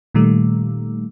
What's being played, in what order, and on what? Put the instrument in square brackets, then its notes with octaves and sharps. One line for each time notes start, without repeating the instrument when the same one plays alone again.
[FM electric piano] A#2 D#3 G3 A3